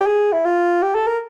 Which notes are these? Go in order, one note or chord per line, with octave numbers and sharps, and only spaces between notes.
G4
G#4
E4
F4
G4
A4
A#4